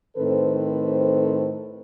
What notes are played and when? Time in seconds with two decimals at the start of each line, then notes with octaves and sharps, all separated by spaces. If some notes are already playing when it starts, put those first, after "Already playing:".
0.17 A2 D#3 C4 A4 B4 C5